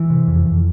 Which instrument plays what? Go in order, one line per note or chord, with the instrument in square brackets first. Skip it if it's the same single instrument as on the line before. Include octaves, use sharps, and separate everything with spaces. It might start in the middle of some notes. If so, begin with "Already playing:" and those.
Already playing: [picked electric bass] E3
C3
F2
F2